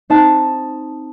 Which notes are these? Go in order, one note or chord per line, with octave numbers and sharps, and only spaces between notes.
C4 D#4 A5